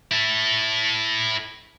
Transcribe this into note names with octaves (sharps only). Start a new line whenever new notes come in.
E4 A4